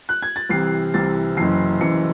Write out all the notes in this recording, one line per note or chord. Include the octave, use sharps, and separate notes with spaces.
F#6
G#6
A6
C2 C3 E3 C7
C2 C3 E3 A6
F#1 F#2 E3 C7
F#1 F#2 E3 C#7